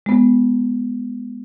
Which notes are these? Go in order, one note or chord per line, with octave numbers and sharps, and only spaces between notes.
G#3 B3